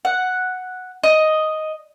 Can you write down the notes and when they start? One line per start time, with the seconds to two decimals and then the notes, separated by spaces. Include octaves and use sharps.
0.05 F#5
1.03 D#5